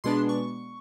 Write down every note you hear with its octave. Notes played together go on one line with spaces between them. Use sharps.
B2 G#3 B3 D4 C6
C#6